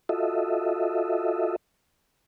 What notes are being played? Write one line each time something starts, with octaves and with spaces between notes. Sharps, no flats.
F4 F#4 A4 D#5 E5